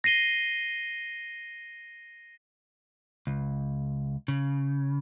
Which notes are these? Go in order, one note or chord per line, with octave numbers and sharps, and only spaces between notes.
A#6 C7 D#7 G7
C#2
C#3